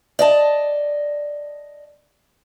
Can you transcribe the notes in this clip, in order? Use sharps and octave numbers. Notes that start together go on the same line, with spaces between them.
D5 D#5 A5